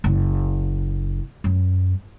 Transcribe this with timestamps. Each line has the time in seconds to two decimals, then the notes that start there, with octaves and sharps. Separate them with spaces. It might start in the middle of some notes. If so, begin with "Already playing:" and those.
0.04 F#1
1.44 F#2